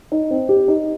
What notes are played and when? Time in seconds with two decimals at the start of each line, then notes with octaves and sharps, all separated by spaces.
0.12 D#4
0.31 C4
0.49 G4
0.68 D#4